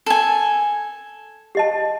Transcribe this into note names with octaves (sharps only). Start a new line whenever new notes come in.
A4 G#5
G4 D#5 A5